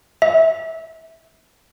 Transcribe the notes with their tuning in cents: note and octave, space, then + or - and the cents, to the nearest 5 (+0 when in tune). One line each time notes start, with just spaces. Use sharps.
E5 -20